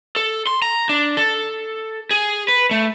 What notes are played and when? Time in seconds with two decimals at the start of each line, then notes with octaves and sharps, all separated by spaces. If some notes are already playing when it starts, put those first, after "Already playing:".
0.16 A4
0.47 C6
0.62 A#5
0.89 D4
1.17 A4
2.11 G#4
2.48 B4
2.71 A3